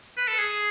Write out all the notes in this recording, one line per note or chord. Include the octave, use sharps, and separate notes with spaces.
B4
A4
G#4